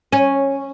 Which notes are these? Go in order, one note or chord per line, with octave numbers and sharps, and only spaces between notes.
C#4